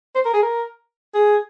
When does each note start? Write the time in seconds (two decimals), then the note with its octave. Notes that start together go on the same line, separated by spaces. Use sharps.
0.15 C5
0.25 A#4
0.34 G#4
0.42 A#4
1.14 G#4